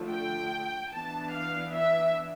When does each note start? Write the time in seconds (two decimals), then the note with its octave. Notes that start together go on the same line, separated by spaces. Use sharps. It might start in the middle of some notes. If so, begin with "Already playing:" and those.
Already playing: D3 F3 A3
0.10 G5
0.93 E3 B3 D4 A5
1.33 F5
1.74 E5